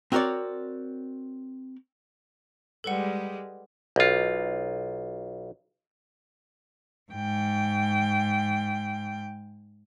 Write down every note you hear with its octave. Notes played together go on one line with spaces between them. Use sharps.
C4 F#4 A#4 C#5 D5
G3 G#3 A4 B4 F#5
B1 F4
G#2 G5